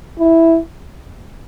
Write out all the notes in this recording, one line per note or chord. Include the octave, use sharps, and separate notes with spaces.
E4